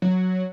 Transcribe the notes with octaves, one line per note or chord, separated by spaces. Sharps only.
F#3